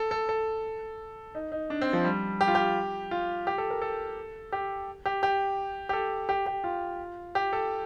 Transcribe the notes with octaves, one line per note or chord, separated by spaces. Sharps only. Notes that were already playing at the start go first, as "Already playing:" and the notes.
Already playing: A4
A4
A4
D#4
D#4
D4
C4
F3
G3
G4
F4
G4
F4
G4
A4
A#4
A4
G4
G4
G4
G4
A4
G4
G4
F4
G4
A4